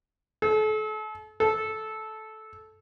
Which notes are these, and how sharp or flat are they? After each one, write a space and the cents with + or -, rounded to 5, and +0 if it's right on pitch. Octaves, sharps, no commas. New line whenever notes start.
A4 -40
A4 -15